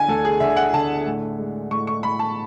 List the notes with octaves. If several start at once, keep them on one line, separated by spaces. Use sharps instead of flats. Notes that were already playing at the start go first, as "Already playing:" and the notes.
Already playing: D3 G#5
D2 A4
G#4
D3 E5
F#5
D3 A5
A2
G#3
A2 C#6
C#6
A2 B5
A5